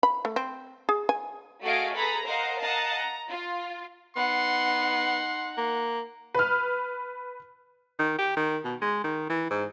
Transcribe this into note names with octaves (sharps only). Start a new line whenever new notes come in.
B5
A3
C4
G#4
G#5
A3 F#4 G#4 D#5 F5 D7
G#4 A4 B4 A#5 B5
A#4 C5 D#5 F5 F#5 A#5
D#5 F5 F#5 A5 A#5
A#5
F4
B3 D#4 F#5 C6
A#3
B4 F6
D#3
G4
D#3
B2
G#3
D#3
E3
G#2